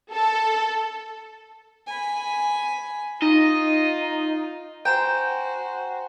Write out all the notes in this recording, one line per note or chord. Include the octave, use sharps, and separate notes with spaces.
A4
G#5 B5
D#4 F4 D#5
F#4 C5 G5 G#5 A#5 E7